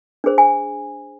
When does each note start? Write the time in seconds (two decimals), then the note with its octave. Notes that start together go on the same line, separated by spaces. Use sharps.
0.24 D4 G#4 C5
0.38 G#5